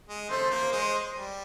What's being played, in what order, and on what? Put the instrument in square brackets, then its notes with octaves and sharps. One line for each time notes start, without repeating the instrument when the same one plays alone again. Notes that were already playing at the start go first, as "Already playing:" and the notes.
[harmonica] G#3
[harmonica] A3 [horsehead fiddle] C5
[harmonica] A#3
G#3
G3